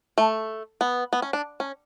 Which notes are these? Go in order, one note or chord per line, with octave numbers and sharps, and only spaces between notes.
A3
B3
B3
C#4
D4
C#4